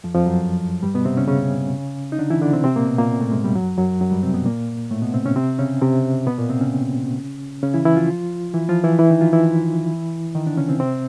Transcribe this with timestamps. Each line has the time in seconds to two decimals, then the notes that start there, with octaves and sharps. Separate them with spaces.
0.04 F2 F3
0.15 F2 F3
0.26 F#2 F#3
0.83 G2 G3
0.94 B2 B3
1.05 C3 C4
1.17 C#3 C#4
1.28 C#3 C#4
2.12 D#4
2.19 D3 D4
2.30 E3 E4
2.41 D3 D4
2.53 C3 C4
2.64 C3 C4
2.76 A#2 A#3
2.87 B2 B3
2.98 A#2 A#3
3.21 A2 A3
3.32 G#2 G#3
3.44 G2 G3
3.55 F#2 F#3
3.78 F#2 F#3
4.01 F#2 F#3
4.11 G2 G3
4.23 C3 C4
4.34 B2 B3
4.46 A#2 A#3
4.91 A2 A3
5.02 B2 B3
5.14 C3 C4
5.25 C#3 C#4
5.36 C3 C4
5.59 C#3 C#4
5.82 C3 C4
6.26 B2 B3
6.38 A#2 A#3
6.50 C3 C4
6.61 C#3 C#4
7.63 C#3 C#4
7.74 E3 E4
7.85 E3 E4
7.97 F3 F4
8.54 E3 E4
8.69 F3 F4
8.84 E3 E4
8.99 E3 E4
9.10 D#3 D#4
9.21 F3 F4
9.33 E3 E4
10.35 D#3 D#4
10.46 D3 D4
10.57 C#3 C#4
10.69 C3 C4
10.80 C3 C4